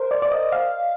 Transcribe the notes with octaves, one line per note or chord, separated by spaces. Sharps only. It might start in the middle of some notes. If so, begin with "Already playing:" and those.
Already playing: A#4 C5
D5
D5
D#5
F5